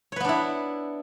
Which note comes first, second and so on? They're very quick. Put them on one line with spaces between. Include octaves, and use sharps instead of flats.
C#5 B4 B3 D4 E4